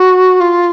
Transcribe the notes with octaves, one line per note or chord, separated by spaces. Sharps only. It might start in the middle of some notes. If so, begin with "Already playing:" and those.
Already playing: F#4
F4